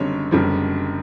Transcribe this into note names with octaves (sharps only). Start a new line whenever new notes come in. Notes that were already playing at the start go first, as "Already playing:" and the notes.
Already playing: F#1 F#2 D3 G3 C4 C#5
F#1 F#2 D3 G3 C4